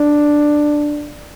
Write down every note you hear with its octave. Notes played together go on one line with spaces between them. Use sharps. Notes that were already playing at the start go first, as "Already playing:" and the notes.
Already playing: D4